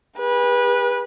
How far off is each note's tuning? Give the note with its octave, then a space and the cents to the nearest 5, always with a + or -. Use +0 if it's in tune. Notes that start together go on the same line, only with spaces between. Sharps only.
G#4 -45 B4 -20